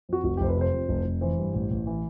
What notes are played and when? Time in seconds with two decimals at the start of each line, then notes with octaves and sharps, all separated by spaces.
0.09 F2 F#4
0.24 F1 F#4
0.37 G4
0.41 F1 C5
0.49 B4
0.56 C3 C5
0.73 F2
0.89 F1
1.05 F1
1.21 E3 C5
1.39 G2
1.54 A1
1.71 A1
1.87 E3